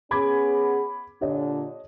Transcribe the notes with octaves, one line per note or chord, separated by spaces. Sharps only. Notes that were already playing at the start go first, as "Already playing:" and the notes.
B3 C#4 G#4 B5 D6 G#6
A#2 D3 D4 G4 C#5 D#5